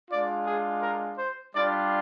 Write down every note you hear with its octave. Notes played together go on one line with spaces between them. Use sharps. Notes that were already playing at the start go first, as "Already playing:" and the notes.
G#3 D4 F4 D5
G#4
A#4
C5
G3 D4 F4 D5